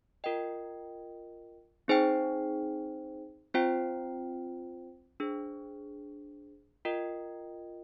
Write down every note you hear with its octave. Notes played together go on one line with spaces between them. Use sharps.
F4 A#4 D#5 G5
C4 D#4 G#4 C5 G5
C4 F4 C5 G5
D4 G#4 C5
F4 A#4 D#5 G5